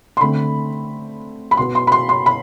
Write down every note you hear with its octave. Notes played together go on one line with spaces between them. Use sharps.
C6
D3 A3 C4 B5
B5
B2 B3 C6
C6
B5
C6
C6
B5